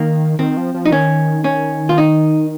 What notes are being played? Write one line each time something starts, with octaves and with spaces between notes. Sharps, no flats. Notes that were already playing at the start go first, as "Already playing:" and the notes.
Already playing: D#3 A#3
D#3 C4
F3
F3
D#4
D#3 C#4
C#4
F4
D#4